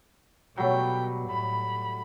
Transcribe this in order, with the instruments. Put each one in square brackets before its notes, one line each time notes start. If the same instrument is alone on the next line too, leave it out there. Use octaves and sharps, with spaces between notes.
[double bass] B2 [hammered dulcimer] F#3 G3 A3 [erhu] G5
[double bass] A2 [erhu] B5